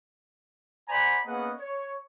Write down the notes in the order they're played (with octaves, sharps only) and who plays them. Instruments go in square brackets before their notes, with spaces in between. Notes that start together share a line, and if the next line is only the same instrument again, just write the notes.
[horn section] C5 D5 F#5 G#5 A#5 B5
A#3 B3 C#4 G#4 D#5 F#5
C#5